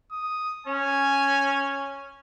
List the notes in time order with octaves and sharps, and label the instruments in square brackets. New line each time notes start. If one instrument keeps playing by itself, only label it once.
[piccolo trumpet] D#6
[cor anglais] C#4 [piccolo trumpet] G#5